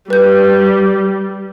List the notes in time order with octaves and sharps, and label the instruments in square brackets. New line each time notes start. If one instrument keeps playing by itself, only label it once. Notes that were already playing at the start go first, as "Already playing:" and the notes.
[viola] G3 [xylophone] B4 G6